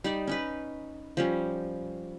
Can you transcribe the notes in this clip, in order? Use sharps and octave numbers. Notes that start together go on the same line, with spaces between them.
G3 D#4 D5
C#4 D#4 B4
F3 G3 C#4